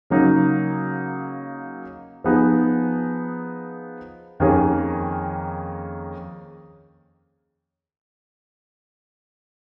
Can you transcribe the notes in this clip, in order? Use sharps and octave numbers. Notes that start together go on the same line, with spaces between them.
C#3 F#3 A#3 D#4
F3 B3 D#4 G#4
F2 D#3 A#3 C#4 G#4